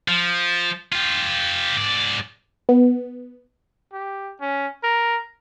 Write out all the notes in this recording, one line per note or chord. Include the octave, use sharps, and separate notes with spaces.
F3
F4 G4
G#2 D5
B3
G4
C#4
A#4